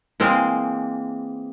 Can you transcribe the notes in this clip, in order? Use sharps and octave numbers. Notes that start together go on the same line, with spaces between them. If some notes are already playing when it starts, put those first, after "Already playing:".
E3 G#3 A#3 C4